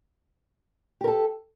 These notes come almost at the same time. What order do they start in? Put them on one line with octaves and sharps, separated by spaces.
G4 A#4 A4